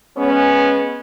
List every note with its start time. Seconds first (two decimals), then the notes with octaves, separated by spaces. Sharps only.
0.16 G#3 B3 C#4